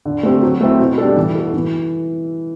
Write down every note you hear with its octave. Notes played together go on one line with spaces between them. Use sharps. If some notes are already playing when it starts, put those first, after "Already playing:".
D3
A3 C4 G4
F#3
A3 C4 E4
B2
G3 D4 A4
E3
B3 F#4 A4
E3